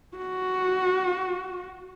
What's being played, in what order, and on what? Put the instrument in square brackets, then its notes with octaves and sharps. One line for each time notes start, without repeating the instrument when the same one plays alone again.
[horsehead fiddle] F#4